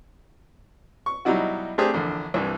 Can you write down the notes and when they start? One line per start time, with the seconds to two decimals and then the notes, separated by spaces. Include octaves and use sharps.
1.06 C#6
1.25 B2 F#3 G3 D#4 E4 F#4
1.78 A3 C4 D4 G4 G#4
1.94 A#1 E2 D3
2.34 C2 G2 E3